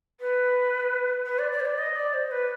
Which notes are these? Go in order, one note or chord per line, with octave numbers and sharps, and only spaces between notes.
B4
B4
D5
D5
C5
D5
D#5
D5
C5
B4